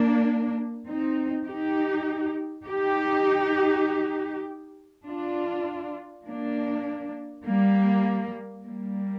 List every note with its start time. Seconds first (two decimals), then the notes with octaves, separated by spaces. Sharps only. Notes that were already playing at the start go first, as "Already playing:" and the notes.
Already playing: A#3 D4
0.87 C4 D#4
1.47 D#4 G4
2.66 D#4 G4
5.06 D4 F4
6.26 A#3 D4
7.45 G3 A#3
8.65 G3 A#3